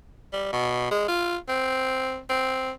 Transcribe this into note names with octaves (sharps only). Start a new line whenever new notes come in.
G3
B2
G#3
F4
C4
C4